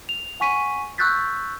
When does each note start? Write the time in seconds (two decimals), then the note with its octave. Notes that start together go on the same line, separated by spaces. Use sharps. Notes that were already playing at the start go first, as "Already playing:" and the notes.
0.09 F7
0.40 F#5 G#5 C#6 B6 D#7
0.98 C#6 E6 F#6 G6 A6 B6